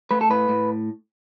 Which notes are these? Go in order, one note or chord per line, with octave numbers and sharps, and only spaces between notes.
A3 B4
A4
A2 B4
A2